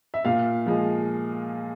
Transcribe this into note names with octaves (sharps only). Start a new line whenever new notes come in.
E5
A#2 F5
F3 G#3